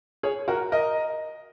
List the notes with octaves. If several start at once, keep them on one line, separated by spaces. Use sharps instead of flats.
G#4 C#5
F#4 A#4
A#4 D#5